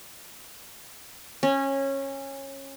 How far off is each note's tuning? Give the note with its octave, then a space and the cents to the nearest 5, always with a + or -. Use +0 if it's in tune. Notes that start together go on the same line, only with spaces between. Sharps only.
C#4 -20